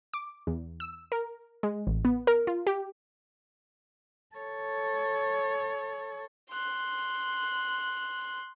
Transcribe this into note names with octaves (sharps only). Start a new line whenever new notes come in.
D6
E2
E6
A#4
G#3
A1
B3
A#4
F4
G4
A4 C#5
C6 F#6